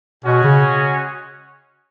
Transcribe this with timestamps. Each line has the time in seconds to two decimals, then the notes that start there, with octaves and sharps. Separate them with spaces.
0.24 B2 G#3 C#4 F#4
0.44 C#3